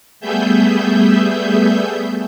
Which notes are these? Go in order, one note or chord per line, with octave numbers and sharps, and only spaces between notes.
G3 A3 B3 G#4 E5 G6